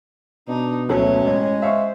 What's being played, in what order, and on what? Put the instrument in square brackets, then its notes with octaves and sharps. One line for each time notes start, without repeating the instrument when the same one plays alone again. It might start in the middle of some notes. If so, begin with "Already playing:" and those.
[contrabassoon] B2 [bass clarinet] D4 [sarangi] D#4
[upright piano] F#1 F#3 A4 [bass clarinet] D2 [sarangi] C#4
[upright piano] A1 [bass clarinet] G#3
[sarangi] C5 [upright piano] E5 F5 C#6